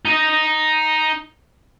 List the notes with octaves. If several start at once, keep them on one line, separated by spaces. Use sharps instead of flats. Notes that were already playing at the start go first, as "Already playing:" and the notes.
D#4 D#5